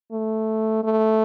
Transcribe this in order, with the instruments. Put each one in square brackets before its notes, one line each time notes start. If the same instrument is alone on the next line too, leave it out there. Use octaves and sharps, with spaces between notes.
[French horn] A3
A3